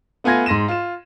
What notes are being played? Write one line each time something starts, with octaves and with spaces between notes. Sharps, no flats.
A3 B3 F4 G#5 G#6 A#6
G#2 C6 A#6 D#7 E7
F4 E7